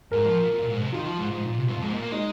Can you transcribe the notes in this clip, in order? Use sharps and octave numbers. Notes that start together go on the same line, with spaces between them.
G#2 A#4
F3
A#2
A#2
A#2
G#2
C3
D#3 F4
F3
G#2
G#2
A#2
C3
F2
G#2
A#2
A#3
G#3 D#4